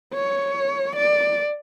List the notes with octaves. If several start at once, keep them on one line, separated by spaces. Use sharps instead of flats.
C#5
D5